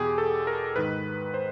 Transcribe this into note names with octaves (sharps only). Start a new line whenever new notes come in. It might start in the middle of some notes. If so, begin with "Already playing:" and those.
Already playing: E2 B2 G4 G#4
A4
A#4
G#2 D#3 B4
C5